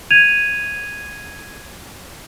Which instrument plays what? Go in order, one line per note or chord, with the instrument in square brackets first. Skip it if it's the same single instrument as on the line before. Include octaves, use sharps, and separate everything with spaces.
[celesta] G#6 D#7 F7